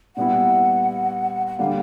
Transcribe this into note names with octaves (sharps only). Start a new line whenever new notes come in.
A#2 G3 B3 E4 F#5
F#5
D3 G3 A#3 F5